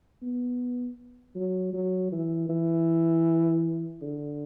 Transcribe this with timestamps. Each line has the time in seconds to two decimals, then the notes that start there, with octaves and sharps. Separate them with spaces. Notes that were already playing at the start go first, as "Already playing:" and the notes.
0.22 B3
1.35 F#3
1.73 F#3
2.12 E3
2.49 E3
4.01 D3